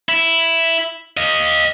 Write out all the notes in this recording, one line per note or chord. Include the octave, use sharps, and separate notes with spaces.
E4
D#5 F5